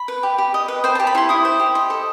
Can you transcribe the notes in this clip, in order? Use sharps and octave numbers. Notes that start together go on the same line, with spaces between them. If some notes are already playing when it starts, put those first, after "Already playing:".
Already playing: B5
B4
G4
G4
D#5
B4
C5 G5
A5
G4
B5
E4 C6
E4 D#6
C5
G4
D#5
A4